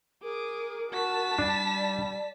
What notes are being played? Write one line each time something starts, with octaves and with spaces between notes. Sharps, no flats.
G#4 A#4 D6
F#4 A5 B6
G3 D4 D5